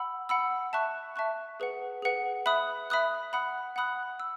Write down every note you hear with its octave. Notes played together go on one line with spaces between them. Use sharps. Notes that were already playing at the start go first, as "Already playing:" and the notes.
Already playing: F#5 B5 E6
F#5 B5 E6
E5 A5 C#6 F#6
E5 A5 C#6 F#6
G#4 B4 F#5
G#4 B4 F#5
E5 B5 D#6 F#6
E5 B5 D#6 F#6
F#5 B5 D#6 F#6
F#5 B5 D#6 F#6
E6